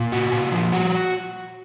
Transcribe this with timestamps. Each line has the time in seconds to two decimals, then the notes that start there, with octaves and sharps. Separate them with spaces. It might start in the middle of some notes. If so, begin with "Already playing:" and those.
Already playing: A#2
0.12 F#4
0.32 A#2
0.52 F3
0.72 F#4